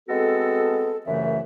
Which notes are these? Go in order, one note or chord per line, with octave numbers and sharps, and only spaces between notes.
G#3 B3 C4 F#4 A4
C2 F#2 C#3 E3 A3 E5